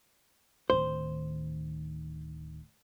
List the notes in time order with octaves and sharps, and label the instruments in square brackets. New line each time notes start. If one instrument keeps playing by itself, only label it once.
[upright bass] D1 D#3 [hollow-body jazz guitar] C5